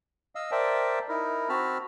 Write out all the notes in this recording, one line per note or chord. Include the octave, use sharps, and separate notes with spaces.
D#5 F5 E6
A#4 C5 D5 E5 G5 A5
D#4 E4 A#4
C4 F#4 A5 B5 F6